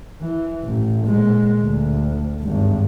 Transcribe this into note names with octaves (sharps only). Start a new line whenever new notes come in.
E3
A1
A#2 G#3
D2
G#1 G2